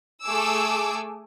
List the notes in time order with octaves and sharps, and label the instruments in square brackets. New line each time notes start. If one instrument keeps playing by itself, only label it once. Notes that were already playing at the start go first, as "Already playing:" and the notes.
[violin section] A3 G#4 G#5 D6 E6